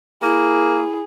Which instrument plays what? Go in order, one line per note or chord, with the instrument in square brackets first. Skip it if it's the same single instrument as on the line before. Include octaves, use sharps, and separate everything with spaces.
[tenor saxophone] A#3 [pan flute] E4 [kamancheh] G#4